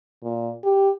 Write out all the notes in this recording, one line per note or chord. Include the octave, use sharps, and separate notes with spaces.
A#2
G4